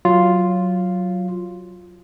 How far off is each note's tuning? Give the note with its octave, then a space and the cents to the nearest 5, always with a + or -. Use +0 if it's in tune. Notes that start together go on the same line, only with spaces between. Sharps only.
F#3 +0 F4 +0